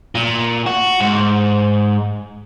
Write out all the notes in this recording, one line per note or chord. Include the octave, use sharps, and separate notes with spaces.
A#2
F#4
G#2